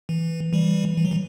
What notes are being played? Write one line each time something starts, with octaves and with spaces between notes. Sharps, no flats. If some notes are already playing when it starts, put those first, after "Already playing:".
E3
E3 G3
E3
F#3
E3